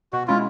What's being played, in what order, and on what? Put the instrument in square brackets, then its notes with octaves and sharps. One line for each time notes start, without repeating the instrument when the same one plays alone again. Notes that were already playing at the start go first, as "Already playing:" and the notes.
[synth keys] B2 [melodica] F#4
[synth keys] G#3 C#4 E4 [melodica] F4